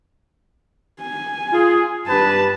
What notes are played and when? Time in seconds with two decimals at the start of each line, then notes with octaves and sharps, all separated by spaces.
1.01 G#5
1.52 F4 G#4
2.08 G2 G4 B4 A5